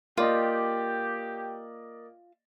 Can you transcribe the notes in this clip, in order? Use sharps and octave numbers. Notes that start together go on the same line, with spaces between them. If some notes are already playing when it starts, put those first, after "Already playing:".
A#3 F4 G4 D5 D#5